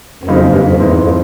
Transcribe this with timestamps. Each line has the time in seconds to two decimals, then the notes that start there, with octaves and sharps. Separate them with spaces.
0.23 F#2
0.28 F2 C#3 F#3 A#3 D#4
0.45 G2
0.63 F2
0.80 E2 G#2 E3 G#3
0.97 F2